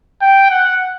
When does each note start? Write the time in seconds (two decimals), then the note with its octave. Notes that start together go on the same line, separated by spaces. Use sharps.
0.22 G5
0.50 F#5